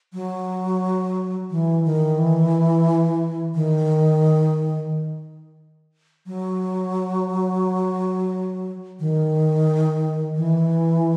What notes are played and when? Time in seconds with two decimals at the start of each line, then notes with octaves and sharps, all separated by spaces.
0.13 F#3
1.50 E3
1.85 D#3
2.18 E3
3.55 D#3
6.26 F#3
9.00 D#3
10.36 E3